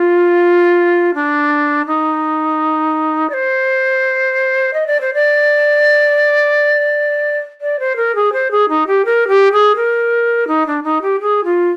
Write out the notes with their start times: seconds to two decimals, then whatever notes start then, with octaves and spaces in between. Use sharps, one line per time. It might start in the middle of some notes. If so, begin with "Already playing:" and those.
Already playing: F4
1.14 D4
1.86 D#4
3.30 D5
3.34 C5
4.74 D#5
4.87 D5
5.01 C5
5.14 D5
7.61 D5
7.80 C5
7.96 A#4
8.15 G#4
8.33 C5
8.51 G#4
8.69 D#4
8.87 G4
9.05 A#4
9.28 G4
9.52 G#4
9.76 A#4
10.48 D#4
10.67 D4
10.84 D#4
11.02 G4
11.21 G#4
11.44 F4